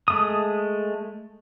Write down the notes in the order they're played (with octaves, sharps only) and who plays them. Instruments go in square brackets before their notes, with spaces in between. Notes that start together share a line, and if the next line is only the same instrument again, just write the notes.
[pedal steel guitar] G#3 A3 D#6